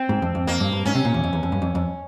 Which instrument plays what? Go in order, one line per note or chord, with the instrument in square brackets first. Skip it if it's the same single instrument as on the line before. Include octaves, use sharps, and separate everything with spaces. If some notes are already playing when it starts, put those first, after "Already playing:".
Already playing: [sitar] C4
[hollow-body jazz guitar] G#2
F2
F2
[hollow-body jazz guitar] F2 [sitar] A#3
[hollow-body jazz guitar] G2
G2
[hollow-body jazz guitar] G#2 [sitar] C#4
[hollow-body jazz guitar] C3
A#2
E2
F2
E2
F2
G2
F2
F2